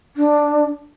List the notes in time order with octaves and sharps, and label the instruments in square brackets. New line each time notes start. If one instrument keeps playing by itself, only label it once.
[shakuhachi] D4